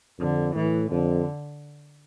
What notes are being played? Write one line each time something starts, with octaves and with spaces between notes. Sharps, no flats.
F2 D3
A2 E3
F2 D3